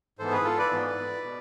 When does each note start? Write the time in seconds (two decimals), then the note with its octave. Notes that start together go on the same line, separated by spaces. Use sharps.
0.19 G#2 E3 B3 A4 C5
0.32 G#4 B4
0.45 F4 A4
0.58 B4 D5
0.72 G#2 E3 B3
1.23 B2